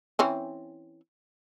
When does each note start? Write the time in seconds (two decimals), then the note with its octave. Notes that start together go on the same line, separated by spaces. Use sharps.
0.19 E3 C4 C#4